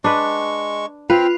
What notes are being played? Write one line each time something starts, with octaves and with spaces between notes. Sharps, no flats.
G#3 D4 B4 C#6
C4 F4 B4 G5